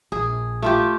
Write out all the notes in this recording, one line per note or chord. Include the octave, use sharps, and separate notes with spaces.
A#1 G#4
A3 F4 G4